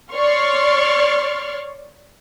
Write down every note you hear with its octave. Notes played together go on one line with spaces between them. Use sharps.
C#5 D5 C6 C#6 F6